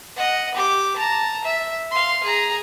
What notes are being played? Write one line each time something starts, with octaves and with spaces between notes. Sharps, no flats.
D#5 F#5
G4 D6
A5 A#5
E5
F5 C6
G#4 A#5